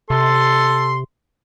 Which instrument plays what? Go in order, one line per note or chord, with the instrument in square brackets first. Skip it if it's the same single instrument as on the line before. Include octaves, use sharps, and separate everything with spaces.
[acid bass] C3 [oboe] A4 [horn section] C6